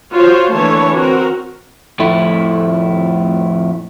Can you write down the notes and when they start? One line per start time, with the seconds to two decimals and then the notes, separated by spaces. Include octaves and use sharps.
0.13 F4 F#4 C5 C#5
0.53 D3 E3 A3 A#3 C#5 A5
0.93 C4 F#4 A#4
1.99 F2 A2 A3 E4